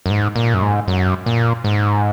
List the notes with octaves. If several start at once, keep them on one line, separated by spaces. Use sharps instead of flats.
F#2
G#2
A#2
F#2
G#2
F#2
A#2
G#2